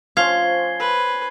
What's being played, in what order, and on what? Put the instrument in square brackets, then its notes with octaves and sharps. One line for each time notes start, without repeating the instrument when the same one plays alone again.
[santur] F3 C#4 C5 [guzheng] F5 [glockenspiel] G#6 C7 G7
[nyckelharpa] B4 [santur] E6